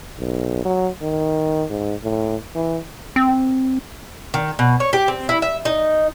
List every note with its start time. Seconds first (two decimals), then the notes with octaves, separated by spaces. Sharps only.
0.19 B1
0.65 F#3
1.02 D#3
1.70 G#2
2.04 A2
2.55 E3
3.16 C4
4.34 D#3
4.59 B2
4.80 C#5
4.93 G4
5.08 C4
5.29 E4
5.42 E5
5.65 D#4